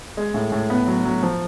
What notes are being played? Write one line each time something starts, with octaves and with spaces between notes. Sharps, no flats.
G#3
A2
A2
B3
F#3
F#3
F3